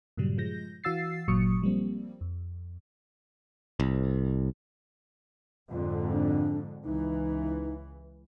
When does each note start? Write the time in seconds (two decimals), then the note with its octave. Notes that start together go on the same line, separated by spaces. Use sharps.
0.17 G2 A#2 C#3 F#3 G3
0.38 F3 G#3 G6 A#6
0.84 E3 F#4 F5 E6 A6 C7
1.28 G1 A#2 F#3 C#6 D#6 C#7
1.62 F3 G3 A#3 C4
2.21 F2
3.80 C2
5.71 F2 G#2 D3 F4
6.12 D4
6.84 C#2 E3 D#4